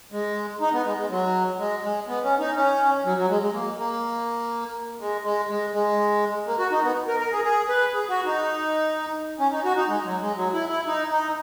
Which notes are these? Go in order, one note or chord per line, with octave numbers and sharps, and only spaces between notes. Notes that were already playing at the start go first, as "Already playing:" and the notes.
G#3
D#4
B3
G#3
G#3
F#3
G#3
G#3
B3
C#4
D#4
C#4
F#3
F#3
G#3
G#3
A#3
A#3
G#3
G#3
G#3
G#3
A#3
F#4
D#4
B3
A#4
A#4
G#4
G#4
B4
G#4
F#4
D#4
C#4
D#4
F#4
D#4
G#3
F#3
G#3
F#3
E4
E4
D#4
D#4